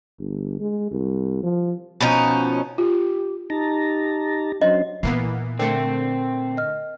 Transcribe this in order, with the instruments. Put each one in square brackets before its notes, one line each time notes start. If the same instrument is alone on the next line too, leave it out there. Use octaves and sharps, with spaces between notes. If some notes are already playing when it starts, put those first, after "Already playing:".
[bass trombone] G1
G#3
C2
F3
[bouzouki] B2 F3 C#4 D#4
[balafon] F4 [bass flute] G4
[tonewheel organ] D#4 A5 A#5 [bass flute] G4
[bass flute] F#3 [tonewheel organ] C#4 D4 C5 [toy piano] D#5
[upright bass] A#2 [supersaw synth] E3 A#3 B3 [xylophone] C7
[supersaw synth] D3 A3 [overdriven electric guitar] C4 [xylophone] A#4 C#7
[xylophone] D#5 F6